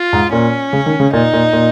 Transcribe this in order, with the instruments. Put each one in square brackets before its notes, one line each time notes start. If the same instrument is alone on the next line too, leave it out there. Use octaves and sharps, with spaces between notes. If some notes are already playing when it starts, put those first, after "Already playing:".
Already playing: [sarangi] F4
[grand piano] G#2
[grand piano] A#2 [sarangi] C#4
[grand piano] C#3
D#3
C#3
[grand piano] A#2 [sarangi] D#4
[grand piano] A#2
A#2